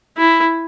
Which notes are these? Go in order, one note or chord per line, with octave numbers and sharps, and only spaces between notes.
E4